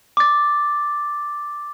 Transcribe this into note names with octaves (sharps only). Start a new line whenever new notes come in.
D6 A6